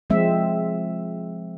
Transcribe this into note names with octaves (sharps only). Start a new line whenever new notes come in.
F3 G#3 C4 E5